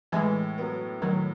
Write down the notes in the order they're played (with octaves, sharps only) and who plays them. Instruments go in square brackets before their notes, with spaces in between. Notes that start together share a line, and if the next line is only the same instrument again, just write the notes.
[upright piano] A2 [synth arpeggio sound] E3 G#3
[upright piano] F#3 B3
[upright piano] A2 [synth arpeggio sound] D#3 F#3